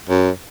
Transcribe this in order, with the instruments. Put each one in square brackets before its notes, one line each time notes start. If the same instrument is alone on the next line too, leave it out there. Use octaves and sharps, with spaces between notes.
[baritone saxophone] F#2